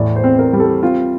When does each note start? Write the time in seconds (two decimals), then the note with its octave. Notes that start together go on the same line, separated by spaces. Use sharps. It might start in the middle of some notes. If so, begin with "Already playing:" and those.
Already playing: E2 A2 D5
0.16 C5
0.24 C4
0.39 A#4
0.53 G3
0.60 A4
0.82 C4 F4